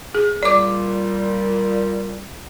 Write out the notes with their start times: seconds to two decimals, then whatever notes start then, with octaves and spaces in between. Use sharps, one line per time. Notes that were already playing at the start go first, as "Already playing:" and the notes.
0.15 G#4
0.43 A#2 G3 D5 D6